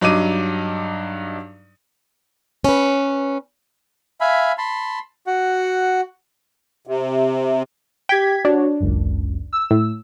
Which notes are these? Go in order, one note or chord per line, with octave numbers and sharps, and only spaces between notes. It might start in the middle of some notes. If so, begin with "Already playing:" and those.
G2 F#3 D#4 D6 D#7
C#4 B4
E5 F5 G#5 B5
A5 B5 C6
F#4 F#5
C3
G4 G5 G#6 B6
D4 F#4 C#5
G#1 C#2 F#2
E6
A2